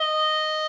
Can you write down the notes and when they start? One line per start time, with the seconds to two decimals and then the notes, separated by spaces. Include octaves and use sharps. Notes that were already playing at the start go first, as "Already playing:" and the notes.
0.01 D#5